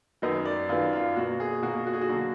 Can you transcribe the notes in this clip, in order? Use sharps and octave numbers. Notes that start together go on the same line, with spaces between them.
F#2 D#3 F#3 B3 D#5
D5
F#2 D#3 F#3 B3 F4
F4
B2 A#3 F#4
G#4
B2 A#3 F#4
F#4
G#4
F#4
D3 F#3 A#3